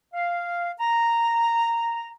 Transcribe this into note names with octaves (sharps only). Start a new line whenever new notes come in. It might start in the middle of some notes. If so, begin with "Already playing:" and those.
F5
A#5